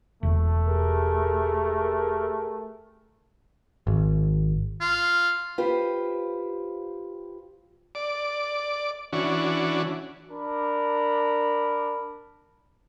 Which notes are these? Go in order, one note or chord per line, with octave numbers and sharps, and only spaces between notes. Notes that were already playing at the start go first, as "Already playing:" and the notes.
E1 A3
G4 G#4 A#4
G#1
F4
F4 G4 B4 C5
D5
E3 C#4 D4 F#4
D4 A#4 B5